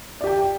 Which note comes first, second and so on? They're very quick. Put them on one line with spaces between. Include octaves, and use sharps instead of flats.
D5 G4 G5